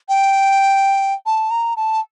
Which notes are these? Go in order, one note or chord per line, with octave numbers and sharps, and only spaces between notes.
G5
A5
A#5
A5